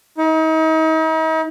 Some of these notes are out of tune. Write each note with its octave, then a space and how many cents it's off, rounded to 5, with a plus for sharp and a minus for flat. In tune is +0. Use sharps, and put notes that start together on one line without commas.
D#4 +40